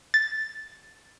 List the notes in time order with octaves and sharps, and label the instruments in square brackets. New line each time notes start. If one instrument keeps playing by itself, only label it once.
[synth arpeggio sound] A6